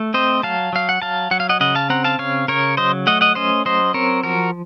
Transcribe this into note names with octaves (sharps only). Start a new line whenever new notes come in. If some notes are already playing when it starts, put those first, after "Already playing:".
Already playing: A3
C4 C5 D#5
F#3 F5 A5
F#3 F5
F#5
F#3 F5 A5
F#3 F#5
F5
D#5 F#5
C#3 D#5 F#5
F5 A5
C4 F#5 A#5
F5 A5
C#3 C#5 F5
C#3 A#4 C#5
F#3 C5 D#5
A3 D#5 F#5
D#5 F#5
C#4 C5 D#5
F#3 C5 D#5
C4 A#4 C#5
F3 F#4 A#4